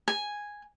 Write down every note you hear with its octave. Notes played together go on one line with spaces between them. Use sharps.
G#5